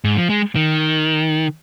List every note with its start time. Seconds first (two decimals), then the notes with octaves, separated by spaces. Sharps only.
0.04 G#2
0.17 F3
0.29 G#3
0.56 D#3